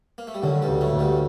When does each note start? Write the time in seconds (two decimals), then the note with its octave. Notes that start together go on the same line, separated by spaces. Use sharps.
0.18 A#3
0.27 A3
0.34 G3
0.43 F#2 D3 F#3
0.62 G2 G3
0.68 D2
0.81 A2 A3
0.93 D2
0.99 G2 G3